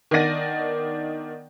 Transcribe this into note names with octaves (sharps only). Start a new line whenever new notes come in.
D#3 B3 D4 D5 A#6 D#7